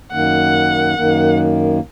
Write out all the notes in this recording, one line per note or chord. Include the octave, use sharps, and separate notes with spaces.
F#2 D#3 A#3 F#5
F#2 D#3 A#3